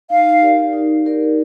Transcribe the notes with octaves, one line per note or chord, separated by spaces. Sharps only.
D#4 F5
G4 A#4 D5
D#4
G4 A#4 D5